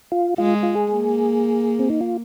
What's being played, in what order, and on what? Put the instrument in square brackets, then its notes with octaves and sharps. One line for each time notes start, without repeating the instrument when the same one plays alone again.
[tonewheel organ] F4
[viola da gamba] G#3 [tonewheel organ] F4
[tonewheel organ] F4
G#4
[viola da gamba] A#3
[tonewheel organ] C4
D#4
F4